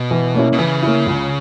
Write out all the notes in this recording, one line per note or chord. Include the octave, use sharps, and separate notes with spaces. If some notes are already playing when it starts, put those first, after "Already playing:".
Already playing: B2
E3
A#3 C#4 E4
B2
C#3 E3
A#3 C#4 E4
C#2